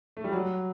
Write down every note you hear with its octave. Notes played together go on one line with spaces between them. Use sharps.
A3
G3
F#3